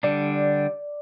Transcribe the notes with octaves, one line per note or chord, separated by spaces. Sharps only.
D3 G3 D4 D5